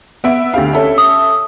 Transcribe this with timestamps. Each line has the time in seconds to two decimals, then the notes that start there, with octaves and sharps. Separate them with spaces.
0.24 B3 E5 D7
0.54 D2 G4 F5
0.73 C#4 A4 E5
0.98 D#6